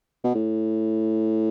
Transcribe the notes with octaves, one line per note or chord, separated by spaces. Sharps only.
B2
A2